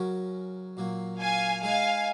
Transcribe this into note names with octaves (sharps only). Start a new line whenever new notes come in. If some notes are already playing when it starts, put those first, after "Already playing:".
Already playing: C#3 F#3 C#4 F#4 A#4
A#2 F#3 A#3
F5 G#5
G#3 D#4 G#4 F5 G#5